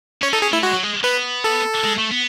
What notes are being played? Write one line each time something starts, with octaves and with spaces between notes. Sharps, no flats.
C#4 C#5
D#4 A4
C#4 G#4
A3 E4
G#3 F#4
F#3
G#3
B3 B4
A4
G#3
A3
B3